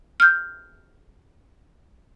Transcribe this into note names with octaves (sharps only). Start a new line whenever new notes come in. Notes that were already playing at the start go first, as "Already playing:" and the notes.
F6 G6